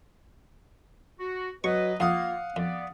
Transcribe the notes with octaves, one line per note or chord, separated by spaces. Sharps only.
F#4
F#3 B4 D#5 C#6
F2 A#3 F4 F5 F#5 D#6
F2 B3 D5